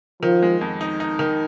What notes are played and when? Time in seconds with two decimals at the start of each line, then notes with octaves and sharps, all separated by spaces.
0.23 D#3 F3
0.43 G#3
0.61 F2
0.81 D#4
1.00 D#4
1.19 D#3